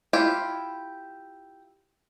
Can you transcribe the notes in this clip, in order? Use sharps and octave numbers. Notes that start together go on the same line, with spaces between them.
E4 F4 G4